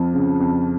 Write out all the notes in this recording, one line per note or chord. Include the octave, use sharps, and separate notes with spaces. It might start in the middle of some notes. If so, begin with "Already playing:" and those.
Already playing: F2 F3
C#3
F2